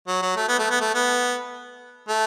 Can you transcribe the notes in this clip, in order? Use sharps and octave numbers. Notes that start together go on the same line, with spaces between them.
F#3
F#3
A3
B3
A3
B3
A3
B3
A3